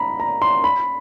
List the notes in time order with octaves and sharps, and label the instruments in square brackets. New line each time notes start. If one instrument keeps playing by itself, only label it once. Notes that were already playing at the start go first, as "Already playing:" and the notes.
Already playing: [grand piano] A#5 B5
A#5
C6
B5